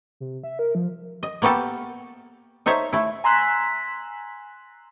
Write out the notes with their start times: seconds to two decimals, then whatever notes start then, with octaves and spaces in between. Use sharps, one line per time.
0.20 C3
0.44 E5
0.59 A#4
0.75 F3
1.23 D#5
1.42 A#3 B3 F#4 G4 A4
2.66 D#4 A4 C5 C#5 E5
2.93 A3 E4
3.24 G#5 A#5 C6 E6 F#6 B6